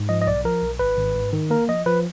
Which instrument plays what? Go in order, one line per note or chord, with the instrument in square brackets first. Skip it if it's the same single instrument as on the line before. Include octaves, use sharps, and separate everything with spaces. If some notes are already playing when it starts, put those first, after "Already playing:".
Already playing: [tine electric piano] G#2
F3 D#5
D#5
B1 D5
F3 A#4
B1
G#1 B4
G#1
G#2
D#3
A#3 A#4
F3 D#5
F3 B4